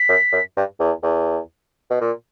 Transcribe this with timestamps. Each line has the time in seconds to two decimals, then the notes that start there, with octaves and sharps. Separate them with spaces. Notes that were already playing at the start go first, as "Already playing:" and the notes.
Already playing: B6
0.09 F#2
0.32 F#2
0.56 G2
0.80 E2
1.03 E2
1.90 B2
2.01 A#2